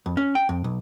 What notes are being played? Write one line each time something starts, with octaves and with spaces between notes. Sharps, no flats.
F2
C#4
G5
F2
B1